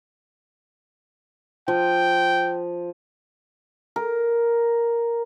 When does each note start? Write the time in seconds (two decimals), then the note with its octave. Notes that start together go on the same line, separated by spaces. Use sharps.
1.68 F3 G5
3.96 A#4